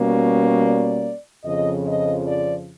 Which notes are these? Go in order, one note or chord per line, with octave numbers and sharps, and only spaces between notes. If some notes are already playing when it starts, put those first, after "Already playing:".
Already playing: B2 G3 A#3 C#4
D5
F2 C#3 F3 D#5
D#5
D5